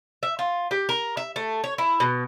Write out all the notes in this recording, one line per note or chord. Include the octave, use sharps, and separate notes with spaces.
E5
F4
G4
A#4
E5
A3
C#5
E4
B2